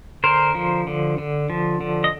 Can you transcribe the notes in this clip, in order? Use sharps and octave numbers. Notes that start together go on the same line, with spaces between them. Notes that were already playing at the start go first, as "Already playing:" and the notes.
D3 A#4 C5
F3
D3
D3
F3
D3
D#5